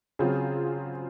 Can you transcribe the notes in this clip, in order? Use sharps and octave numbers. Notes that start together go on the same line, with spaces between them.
C#3 F#3 C4 F4 G#4